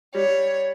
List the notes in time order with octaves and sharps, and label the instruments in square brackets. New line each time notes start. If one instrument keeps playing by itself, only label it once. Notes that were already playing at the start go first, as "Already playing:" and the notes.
[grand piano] G3 [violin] C#5